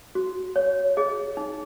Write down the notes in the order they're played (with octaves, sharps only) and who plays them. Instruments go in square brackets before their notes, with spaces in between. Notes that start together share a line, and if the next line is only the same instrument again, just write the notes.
[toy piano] F#4
C#5
G#4 D#5
D#4